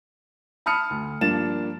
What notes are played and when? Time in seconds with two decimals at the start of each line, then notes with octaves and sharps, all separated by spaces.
0.66 A5 B5 D#6 F6 C#7
0.90 D2
1.21 G2 F3 A#3 D4 A6 E7